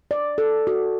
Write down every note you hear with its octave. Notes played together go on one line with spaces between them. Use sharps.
D5
A4
F#4